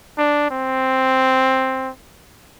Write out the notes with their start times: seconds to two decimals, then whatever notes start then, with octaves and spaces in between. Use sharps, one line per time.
0.18 D4
0.51 C4